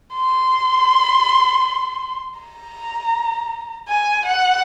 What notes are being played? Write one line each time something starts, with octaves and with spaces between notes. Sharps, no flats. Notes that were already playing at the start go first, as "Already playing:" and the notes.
C6
A#5
G#5
F#5